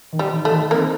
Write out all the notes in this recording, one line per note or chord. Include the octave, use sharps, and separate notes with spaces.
D#3
G3
D#3
A3
D#3
A#3 C4